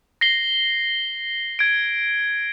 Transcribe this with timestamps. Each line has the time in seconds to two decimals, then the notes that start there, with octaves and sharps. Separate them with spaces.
0.21 A#6 C7 G7
1.59 G#6 D7